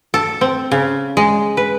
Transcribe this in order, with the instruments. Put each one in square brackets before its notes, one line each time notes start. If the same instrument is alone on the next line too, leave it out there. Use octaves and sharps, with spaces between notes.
[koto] A4
C4
C#3
G#3
B4